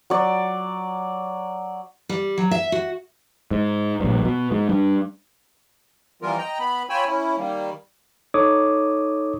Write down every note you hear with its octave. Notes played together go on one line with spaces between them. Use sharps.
F#3 D5
G3
F#3
E5
F#4
G#2
A#1 G2
B2
G#2
G2
E3 F3 G3 B3 F4 A#4
D#5 G5 A#5
B3 B5
F4 C#5 G5 G#5 B5 E6
C#4 E4
D#3 G3 A#3
D#4 A4 C#5 D6 D#6